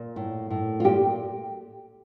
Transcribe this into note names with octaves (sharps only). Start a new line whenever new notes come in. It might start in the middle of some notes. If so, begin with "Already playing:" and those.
Already playing: A#2
A2
A2
F4
A#2 G4